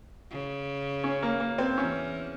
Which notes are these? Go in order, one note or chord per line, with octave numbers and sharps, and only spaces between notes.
C#3
C#4
A#3
A#3
C4
E2 E3 C#4